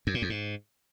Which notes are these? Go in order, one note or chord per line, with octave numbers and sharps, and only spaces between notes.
F#2
A#2
F2
G#2